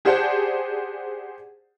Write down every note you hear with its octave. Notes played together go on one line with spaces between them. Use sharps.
G4 G#4 C5 D5 F#5 A5